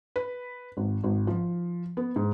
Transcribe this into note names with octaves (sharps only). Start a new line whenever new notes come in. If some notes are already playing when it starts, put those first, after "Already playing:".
B4
G#1
G#1
F3
B3
G#2